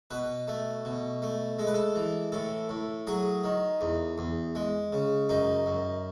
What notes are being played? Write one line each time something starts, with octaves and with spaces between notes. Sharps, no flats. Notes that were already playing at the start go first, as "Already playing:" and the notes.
B2 B4
A3
B2
A3
G#3 A4
B4
A4
E3
A2 A4
A2
F#3 G#4
D#3
E2
E2
G#3
C#3
F#2 D#4
F#2